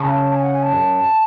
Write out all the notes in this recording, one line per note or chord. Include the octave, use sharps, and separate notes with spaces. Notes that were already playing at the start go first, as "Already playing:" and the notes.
Already playing: C#3 A5
G#5
F#5
G#5
A5
F#2